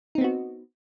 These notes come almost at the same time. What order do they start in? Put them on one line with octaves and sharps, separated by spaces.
D#4 C4 B3 F#4